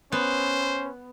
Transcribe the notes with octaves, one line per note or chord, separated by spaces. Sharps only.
B3 C#4 C5